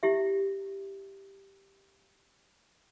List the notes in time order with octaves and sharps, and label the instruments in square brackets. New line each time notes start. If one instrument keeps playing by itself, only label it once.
[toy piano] E4 G4 E5